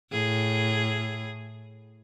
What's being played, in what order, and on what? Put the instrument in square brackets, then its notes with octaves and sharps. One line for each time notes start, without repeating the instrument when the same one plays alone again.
[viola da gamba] A2 G#4